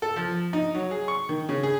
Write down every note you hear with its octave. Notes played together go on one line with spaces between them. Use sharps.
A4
F3
D#4
F#3
G#4
C#6
D#3
C#3
G#4